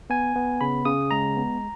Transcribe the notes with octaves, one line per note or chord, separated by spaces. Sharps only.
B3 G#5
B3
C#3 B5
C#3 D#6
G#3 A#5
B3